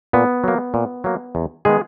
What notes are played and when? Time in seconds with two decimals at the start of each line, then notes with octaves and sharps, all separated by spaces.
0.13 A#2 B3
0.44 F#3 A#3
0.74 A#2
1.04 F#3 A#3
1.35 E2
1.65 D#3 G#3 B3 G#4